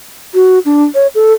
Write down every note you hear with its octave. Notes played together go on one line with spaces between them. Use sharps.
F#4
D4
C#5
A4